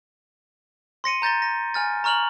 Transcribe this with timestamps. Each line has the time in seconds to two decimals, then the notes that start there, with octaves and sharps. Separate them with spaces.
1.04 C6 A#6 C#7 D#7
1.22 A#5 G6 A6 A#6 G7
1.42 A#6
1.74 G#5 F6 A6
2.04 A#5 C#6 F6 F7 F#7